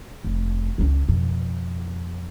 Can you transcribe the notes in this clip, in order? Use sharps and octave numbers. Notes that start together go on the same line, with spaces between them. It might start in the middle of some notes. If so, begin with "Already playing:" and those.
F1
C#2 C#4
F2 B2